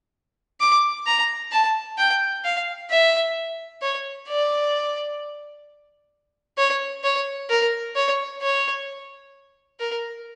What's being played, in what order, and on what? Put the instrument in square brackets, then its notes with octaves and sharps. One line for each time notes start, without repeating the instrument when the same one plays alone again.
[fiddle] D6
A#5
A5
G5
F5
E5
C#5
D5
C#5
C#5
A#4
C#5
C#5
A#4